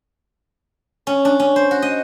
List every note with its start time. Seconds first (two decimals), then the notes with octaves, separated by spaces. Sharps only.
1.07 C#4
1.25 D4
1.40 C#4
1.56 C5
1.71 F#4
1.82 D#5